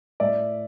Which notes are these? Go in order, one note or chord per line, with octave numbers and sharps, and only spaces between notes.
A2 D5 E5